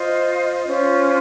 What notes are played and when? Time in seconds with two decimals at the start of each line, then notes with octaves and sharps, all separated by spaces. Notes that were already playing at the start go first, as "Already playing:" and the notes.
Already playing: F4 C5 D#5
0.66 C#4 F4 C5